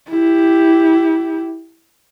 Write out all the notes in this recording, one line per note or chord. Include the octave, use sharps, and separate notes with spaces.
E4 G4